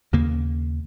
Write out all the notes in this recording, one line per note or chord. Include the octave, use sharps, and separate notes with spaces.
D#2 C#3 A#3